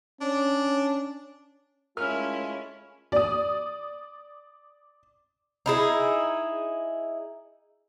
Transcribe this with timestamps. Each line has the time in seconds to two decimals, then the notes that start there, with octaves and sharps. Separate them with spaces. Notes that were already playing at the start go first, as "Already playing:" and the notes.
0.21 C#4 D4
1.97 G#3 A3 C#4 E4 F4 A#4 F6
3.12 D5 D#6
5.66 D#4 E4 G#4